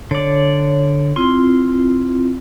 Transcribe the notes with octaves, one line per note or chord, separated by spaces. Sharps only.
D3 C#5 D5
C4 E4 F4 C6